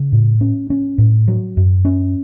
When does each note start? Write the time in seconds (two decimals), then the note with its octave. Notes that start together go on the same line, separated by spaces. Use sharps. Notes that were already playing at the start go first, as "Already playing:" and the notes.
Already playing: C#3
0.12 A2
0.41 C#4
0.70 C#4
0.98 A2
1.28 F#3
1.57 F#2
1.85 C#4